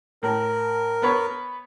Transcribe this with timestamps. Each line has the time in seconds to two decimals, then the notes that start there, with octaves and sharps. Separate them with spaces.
0.23 A2 A#4
1.02 B3 B4 C#5